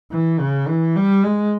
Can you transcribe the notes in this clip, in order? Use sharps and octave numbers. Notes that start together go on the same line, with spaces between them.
E3
C#3
E3
G3
G#3